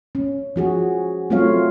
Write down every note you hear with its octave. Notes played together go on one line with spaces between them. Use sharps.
C#4
F3 F#4 G#4
F#3 A3 C4 F4 C#5 F5